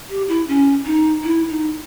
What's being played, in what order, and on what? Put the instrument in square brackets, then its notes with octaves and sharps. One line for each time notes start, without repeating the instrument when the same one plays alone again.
[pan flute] G4
E4
C#4
D#4
E4
D#4